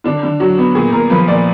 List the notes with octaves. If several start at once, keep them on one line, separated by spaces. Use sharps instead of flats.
D3 D4
D3
F#3 F#4
B3
A#2 G#4
A#2 A#4
F3 B4
A#2 D5